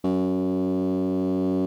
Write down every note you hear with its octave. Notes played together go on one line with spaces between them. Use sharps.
F#2